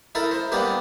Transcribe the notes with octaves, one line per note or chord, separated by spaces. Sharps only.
D#4 E4 A4 A#4 D#5
C5
G3 A#3 B3 D4 D#4 G4